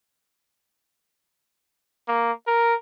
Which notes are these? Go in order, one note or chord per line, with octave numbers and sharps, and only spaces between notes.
A#3
A#4